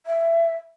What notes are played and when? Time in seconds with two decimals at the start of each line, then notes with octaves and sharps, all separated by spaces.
0.06 E5